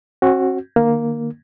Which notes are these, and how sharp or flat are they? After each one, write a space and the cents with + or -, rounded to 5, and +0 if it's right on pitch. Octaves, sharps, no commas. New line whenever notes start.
C4 +45 F#4 +0
D#3 -45 A#3 +0